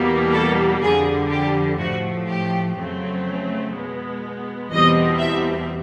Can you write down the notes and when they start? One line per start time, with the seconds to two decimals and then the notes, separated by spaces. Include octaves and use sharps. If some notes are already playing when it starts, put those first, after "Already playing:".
Already playing: E2 B2 G3 A#3
0.32 A4
0.81 F2 D3 G3 G#4
1.30 G4
1.78 A2 F3 A3 F#4
2.27 G4
2.76 F2 C#3 F#3 A3 C4
3.74 B2 G#3 B3
4.71 E2 B2 G3 C4 D#5
5.19 E5